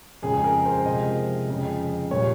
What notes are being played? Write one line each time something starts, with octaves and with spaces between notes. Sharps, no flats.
F2 C#3 G#3 G#4
G#4
A#4
C5
C3 F3 G#3 D#5
F2 C#3 G#3
A#2 G3 C#5